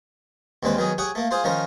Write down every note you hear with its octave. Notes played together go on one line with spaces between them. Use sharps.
D#2 D3 G#3 C4 B4
D#3 F#3 B3 G#4
G4 G#4 C#5 F#5
A3 A#3
F4 G#4 C5 C6
D#3 F3 C#4 A#4 C6